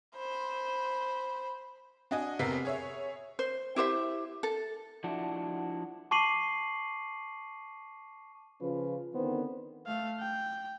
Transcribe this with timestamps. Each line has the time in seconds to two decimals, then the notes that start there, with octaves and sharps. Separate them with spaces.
0.16 C5 B5
2.11 D4 F#4 D#5 G#5
2.39 F1 C3 B3 A#4 B6 C7
2.65 G#4 C#5 E5
3.39 C5
3.76 E4 G4 C5 E5
4.43 A4
5.04 F3 D4 E4 F#4
6.11 A5 C#6 D6 C7 D#7 F#7
8.60 C#3 F3 C#4 F4 B4
9.14 D3 D#3 B3 C4 C5
9.87 A3 F5
10.19 G5